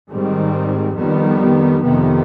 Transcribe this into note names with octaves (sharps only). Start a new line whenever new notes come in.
G#2 D#3 G3 C4
F2 D#3 G3 B3
F2 C3 D#3 B3